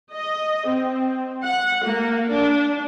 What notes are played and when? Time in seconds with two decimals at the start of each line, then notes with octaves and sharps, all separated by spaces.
0.12 D#5
0.67 C4
1.44 F#5
1.84 A#3
2.31 D4